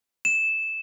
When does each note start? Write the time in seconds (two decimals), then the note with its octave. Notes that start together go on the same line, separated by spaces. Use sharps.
0.25 E7